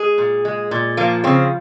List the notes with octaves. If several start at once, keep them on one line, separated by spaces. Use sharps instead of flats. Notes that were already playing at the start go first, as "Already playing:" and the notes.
Already playing: G#3 G#4
A#2
G#3
A#2
F3 A#3
C#3 C4